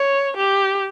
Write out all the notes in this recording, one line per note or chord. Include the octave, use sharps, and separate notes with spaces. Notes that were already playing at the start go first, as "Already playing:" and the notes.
Already playing: C#5
G4